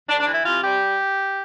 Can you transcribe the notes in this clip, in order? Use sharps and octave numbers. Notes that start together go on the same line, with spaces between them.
D2 D4
D4
E3
E4
C3 F4
G3 G4